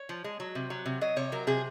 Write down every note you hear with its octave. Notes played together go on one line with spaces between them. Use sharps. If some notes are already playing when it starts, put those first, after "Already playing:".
Already playing: C#5
F3
G#3
F#3
C3
F#3
C3
F#3 D#5
C3 C#5
F#3 A#4
C3 G#4